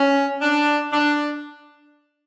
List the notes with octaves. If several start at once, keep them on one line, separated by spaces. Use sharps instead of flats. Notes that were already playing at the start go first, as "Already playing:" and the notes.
Already playing: C#4
D4
D4